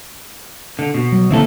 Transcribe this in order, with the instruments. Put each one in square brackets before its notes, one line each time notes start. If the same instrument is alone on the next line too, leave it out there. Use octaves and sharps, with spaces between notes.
[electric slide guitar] D3
B2
[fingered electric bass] F#3
[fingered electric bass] D3 A#3 C#4 [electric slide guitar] C4 E4 A4